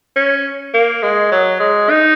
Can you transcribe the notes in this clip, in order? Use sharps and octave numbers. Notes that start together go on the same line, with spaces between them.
C#4
A#3
G#3
F#3
G#3
D#4